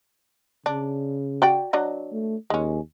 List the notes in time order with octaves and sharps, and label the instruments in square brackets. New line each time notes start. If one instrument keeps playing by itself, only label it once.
[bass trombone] C#3 [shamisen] D4
[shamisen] F#4 D5 G5
F#3 D4 D#5
[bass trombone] A3
[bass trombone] D#2 [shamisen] G#3 C#4